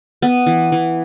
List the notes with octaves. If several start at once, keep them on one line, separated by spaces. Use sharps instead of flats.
B3
E3
E3